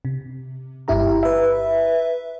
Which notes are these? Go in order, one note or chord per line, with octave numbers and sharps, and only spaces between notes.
C3
G1 G2 E4 G4 A#5
B4 E5